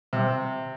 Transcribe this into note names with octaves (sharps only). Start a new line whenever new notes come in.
C3